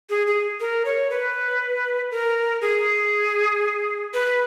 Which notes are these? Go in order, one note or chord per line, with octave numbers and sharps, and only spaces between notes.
G#4
G#4
A#4
C#5
B4
A#4
G#4
B4